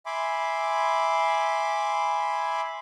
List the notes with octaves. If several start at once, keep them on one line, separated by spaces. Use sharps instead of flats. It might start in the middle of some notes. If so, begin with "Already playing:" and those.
E5 G#5 B5 C6 D6